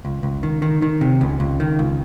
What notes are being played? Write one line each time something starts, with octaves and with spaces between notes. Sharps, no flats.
C#2
C#2
D#3
D#3
D#3
C3
C#2
C#2
D#3
C#2